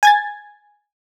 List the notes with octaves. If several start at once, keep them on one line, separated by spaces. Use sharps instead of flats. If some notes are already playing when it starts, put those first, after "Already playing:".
G#5 G#6 A6